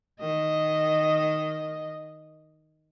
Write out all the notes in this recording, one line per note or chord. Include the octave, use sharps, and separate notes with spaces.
D#3 D#5